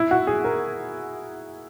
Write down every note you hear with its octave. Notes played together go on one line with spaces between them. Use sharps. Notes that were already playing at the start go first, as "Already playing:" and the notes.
Already playing: E4
F#4
G#4
A#4